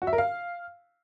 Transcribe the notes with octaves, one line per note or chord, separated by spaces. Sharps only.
F#4
E5
A#4
F5